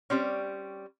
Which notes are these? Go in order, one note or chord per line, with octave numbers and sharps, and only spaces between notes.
G3 C4 C#4